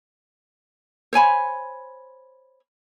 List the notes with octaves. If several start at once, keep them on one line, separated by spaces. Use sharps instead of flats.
C5 C#5 G#5 B5